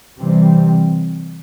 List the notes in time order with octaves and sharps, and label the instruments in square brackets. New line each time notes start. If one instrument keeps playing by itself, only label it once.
[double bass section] C3 E3 G3 C4